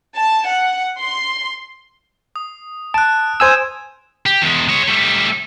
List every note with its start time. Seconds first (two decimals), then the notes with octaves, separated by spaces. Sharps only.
0.16 A5
0.47 F#5
0.99 C6
2.36 D#6
2.94 A5 F#6 D7
3.40 C5 G#5 D#6 E6 G#6 E7
4.26 G4
4.42 E2 G#3
4.69 G#3 C#5
4.88 G3 A3